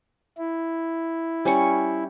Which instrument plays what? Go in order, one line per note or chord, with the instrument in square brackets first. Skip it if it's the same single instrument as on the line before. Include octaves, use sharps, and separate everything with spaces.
[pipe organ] E4
[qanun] G3 C#4 C#6